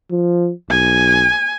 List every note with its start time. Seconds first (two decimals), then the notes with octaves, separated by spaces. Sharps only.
0.11 F3
0.70 B1 G#5